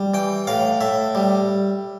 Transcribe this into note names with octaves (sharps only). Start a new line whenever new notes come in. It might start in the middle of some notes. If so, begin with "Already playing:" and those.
Already playing: G3
E3 G5
A2 F5
A2 E5
G3